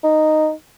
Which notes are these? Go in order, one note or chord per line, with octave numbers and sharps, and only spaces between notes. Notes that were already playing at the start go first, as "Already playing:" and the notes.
D#4